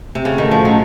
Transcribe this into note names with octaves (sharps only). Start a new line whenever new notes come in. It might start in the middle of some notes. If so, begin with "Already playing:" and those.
C3
A2 C#3 A3 C#4 F#4 A4
D#3
F3
F#3